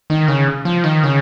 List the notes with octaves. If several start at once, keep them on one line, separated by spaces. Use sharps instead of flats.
D#3
C#3
F3
D#3
C#3